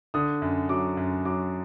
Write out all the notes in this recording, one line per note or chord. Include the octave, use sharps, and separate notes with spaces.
D3 D#6
F#2
F#3 D6
F#2
F#3 D6